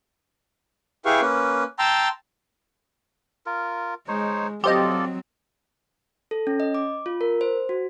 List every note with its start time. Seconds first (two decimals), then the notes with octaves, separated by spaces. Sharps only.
1.05 E4 G4 G#4 B4 F5 C#6
1.21 A#3 C#4 B4
1.79 G5 A5 A#5 C6 E6
3.46 F4 A#4
4.08 G#3 D#4 C5 C#5
4.64 F#3 C4 F4 G4 A4 C5 D5 D#5
6.31 A4
6.47 C#4
6.60 D#5
6.74 D6
7.06 F4
7.21 A#4
7.41 C5
7.69 F#4